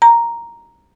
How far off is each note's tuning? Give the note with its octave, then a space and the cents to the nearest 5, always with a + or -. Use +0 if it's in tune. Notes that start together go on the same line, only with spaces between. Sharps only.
A#5 +0